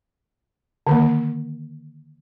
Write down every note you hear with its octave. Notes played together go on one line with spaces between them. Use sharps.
D3 D#3 A#3